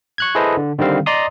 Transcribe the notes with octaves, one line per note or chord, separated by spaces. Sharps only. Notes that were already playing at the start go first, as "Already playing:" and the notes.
C#6 F#6 G#6
E4 G#4 A4 B4 C5 D#5
D3
D3 D#3 G3 C4 F5
D5 D#5 A#5 C6 D#6